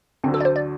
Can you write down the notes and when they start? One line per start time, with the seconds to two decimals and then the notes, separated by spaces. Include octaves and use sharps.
0.24 D2 D3 F#3 C4
0.34 A4
0.40 D5
0.45 C5
0.56 D5